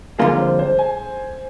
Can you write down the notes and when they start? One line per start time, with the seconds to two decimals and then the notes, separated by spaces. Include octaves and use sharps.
0.19 F2 D3 G3 A#3 F4 G#4
0.39 C5
0.59 C5
0.79 G#5